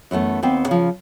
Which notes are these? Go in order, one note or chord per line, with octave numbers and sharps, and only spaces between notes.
F#2 E3 A3 B3
D#2 B3 C4 G5
C#3 F3